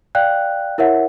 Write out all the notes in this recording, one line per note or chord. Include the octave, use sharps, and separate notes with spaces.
D5 F5 G5 F#6
E4 A#4 C#5 E5 F#5